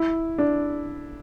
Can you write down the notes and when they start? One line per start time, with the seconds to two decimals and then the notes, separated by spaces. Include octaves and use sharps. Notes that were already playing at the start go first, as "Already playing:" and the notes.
Already playing: E4
0.38 D4